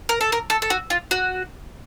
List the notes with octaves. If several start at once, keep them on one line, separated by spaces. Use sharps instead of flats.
A#4
A4
A#4
A4
A4
F#4
F4
F#4